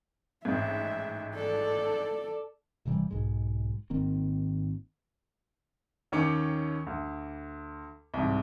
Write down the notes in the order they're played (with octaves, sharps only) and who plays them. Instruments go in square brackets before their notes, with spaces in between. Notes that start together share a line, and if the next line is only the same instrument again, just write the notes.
[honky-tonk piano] A1 G#2 [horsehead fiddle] E5
[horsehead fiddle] A4 D5
[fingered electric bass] D#1 C3 E3 G3
B1 G#2 G#3
G#1 D#3 A#3 C4
[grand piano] D#2 D#3 C#4 C#5 D6 C#7
D2
C2 G#2